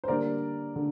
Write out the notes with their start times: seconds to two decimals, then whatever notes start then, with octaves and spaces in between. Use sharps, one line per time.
0.04 C5
0.08 D3 G3 A#3 A#4 D5
0.76 D3